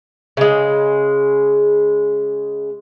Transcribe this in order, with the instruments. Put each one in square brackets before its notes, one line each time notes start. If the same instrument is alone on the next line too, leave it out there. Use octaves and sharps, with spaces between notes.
[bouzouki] C#3 G#3